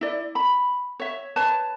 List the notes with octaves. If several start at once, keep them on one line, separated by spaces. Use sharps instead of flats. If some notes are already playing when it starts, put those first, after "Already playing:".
E4 D5
B5
C#5 E5
B4 C#5 A5